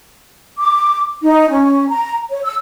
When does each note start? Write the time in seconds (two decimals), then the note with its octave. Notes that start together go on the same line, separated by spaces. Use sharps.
0.58 D6
1.23 D#4
1.50 C#4
1.90 A#5
2.31 C#5
2.44 E6